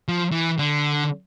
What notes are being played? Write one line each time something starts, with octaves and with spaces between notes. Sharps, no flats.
F3
E3
D3